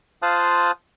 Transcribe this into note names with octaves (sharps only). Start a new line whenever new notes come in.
F4 C5 F5 A5 D#6 F#6